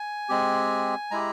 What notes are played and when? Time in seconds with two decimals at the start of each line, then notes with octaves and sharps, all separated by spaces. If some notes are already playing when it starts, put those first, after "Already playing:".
Already playing: G#5
0.29 G#3 C4 G4
1.11 G#3 E4 G4 A#5